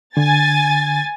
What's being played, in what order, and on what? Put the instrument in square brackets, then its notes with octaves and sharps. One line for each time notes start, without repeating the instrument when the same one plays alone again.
[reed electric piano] D3 [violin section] G#5 A6